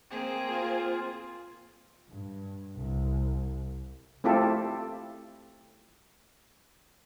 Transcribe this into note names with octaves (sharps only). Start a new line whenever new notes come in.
A#3 C4 G#4
F4
G2
C2
A3 C4 E4 F4 G4 A4